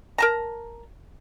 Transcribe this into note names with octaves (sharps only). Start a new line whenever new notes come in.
A#4 A5 A#5